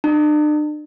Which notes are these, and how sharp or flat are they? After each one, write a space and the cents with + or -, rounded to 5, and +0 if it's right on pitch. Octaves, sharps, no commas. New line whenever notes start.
D4 +40